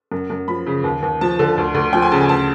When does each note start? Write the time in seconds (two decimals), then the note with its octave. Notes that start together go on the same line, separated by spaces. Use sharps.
0.12 F#2
0.30 F#2
0.48 F3 B5
0.66 C#3
0.84 D#2
1.03 D#2
1.21 F3 A5
1.39 D3
1.58 D2
1.74 D2
1.93 F3 G5
2.02 G#5
2.12 C#3 A5
2.21 G#5
2.29 D2 A5